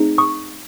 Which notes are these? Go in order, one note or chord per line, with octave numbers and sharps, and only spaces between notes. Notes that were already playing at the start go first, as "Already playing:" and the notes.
Already playing: A3 C4 D#4 G#4
C#6 D#6